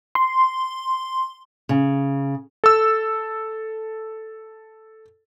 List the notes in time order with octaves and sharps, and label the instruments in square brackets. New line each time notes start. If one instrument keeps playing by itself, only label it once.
[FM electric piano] C6
[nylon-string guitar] C#3
[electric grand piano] A4 E6